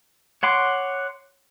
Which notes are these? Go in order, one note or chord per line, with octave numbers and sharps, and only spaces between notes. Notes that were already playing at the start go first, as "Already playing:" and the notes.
C#5 F#5 C6 D6